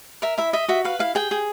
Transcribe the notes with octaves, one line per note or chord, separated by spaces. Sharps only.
A#4 E5
E4 E5
D#5 E5
F#4 E5
B4 F5
E4 F5
G#4 G5
G#4